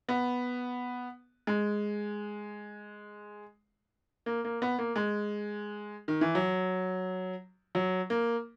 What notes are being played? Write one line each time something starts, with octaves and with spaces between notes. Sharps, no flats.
B3
G#3
A#3
A#3
B3
A#3
G#3
D#3
E3
F#3
F#3
A#3